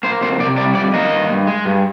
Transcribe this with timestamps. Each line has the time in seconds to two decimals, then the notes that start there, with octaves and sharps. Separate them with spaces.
0.03 A#3 C5
0.21 F2 C5
0.40 C3 D5
0.57 G3 D5
0.75 F2 D5
0.94 A#3 D#5
1.12 G2
1.29 G2
1.47 G#3
1.65 G2